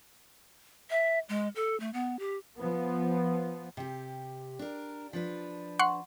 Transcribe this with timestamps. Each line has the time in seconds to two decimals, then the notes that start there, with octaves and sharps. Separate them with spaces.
0.90 E5
1.29 G#3
1.55 A4
1.80 A3
1.93 B3
2.19 G4
2.58 F3 B3
3.77 C3 G4
4.59 D4 A#4
5.13 F3 D4 B4
5.79 F#5 C6 C#6